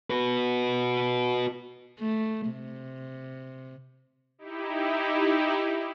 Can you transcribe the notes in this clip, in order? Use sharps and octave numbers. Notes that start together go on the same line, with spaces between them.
F#4 B4
A3
C3
D#4 E4 G4